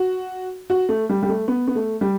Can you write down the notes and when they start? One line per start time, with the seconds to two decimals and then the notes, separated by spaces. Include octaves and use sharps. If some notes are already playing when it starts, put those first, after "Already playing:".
Already playing: F#4
0.70 F#4
0.89 A3
1.09 G3
1.23 G3
1.29 A3
1.48 B3
1.67 B3
1.75 A3
2.01 G3